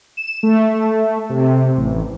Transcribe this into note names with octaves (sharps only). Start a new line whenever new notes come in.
E7
A3
C3
A1